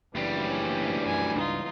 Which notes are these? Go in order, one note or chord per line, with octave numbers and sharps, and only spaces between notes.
F#1 D2 E3 G3
C#4
F#2 G#5
C#2 G2 D4 D#4 F4